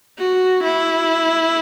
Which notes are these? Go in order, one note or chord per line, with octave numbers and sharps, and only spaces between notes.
F#4
E4